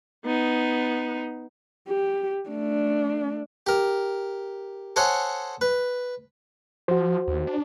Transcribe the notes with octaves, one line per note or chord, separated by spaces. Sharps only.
B3 D#4
G4
A3 D4
G4 A#4
A4 C5 C#5 D#5 F#5 G#5
B4
F3 F#4 C5
D#2
D4